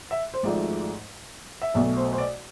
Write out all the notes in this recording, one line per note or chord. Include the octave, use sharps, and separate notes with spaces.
E5
C5
G#1 G#2 F3 A3 D5
E5
B1 B2 A3 D5
C5
C5
D5